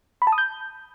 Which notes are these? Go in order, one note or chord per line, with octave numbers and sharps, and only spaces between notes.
B5
A5
D#6
G6